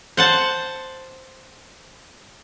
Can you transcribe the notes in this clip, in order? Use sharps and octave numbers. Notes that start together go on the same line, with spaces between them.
C5 F#5 A5